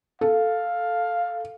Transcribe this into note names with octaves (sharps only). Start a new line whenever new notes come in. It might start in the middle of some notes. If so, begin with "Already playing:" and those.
A4 F5